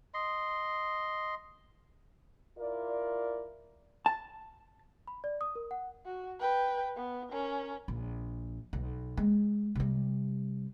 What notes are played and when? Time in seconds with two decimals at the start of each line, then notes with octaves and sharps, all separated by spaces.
0.14 D#5 C6
2.58 E4 F4 A#4 D5
4.06 A5
5.07 B5
5.24 D5
5.41 D#6
5.56 A#4
5.71 F#5
6.06 F#4
6.39 B4 G5
6.96 B3
7.29 C#4 A#4
7.88 A#1
8.73 B1
9.17 G#3
9.75 C3 G3